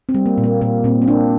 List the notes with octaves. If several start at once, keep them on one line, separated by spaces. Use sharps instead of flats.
C4
G3
A#3
A#2
A#3
A#2 A#3
A#2 C4
C4
A#3 D4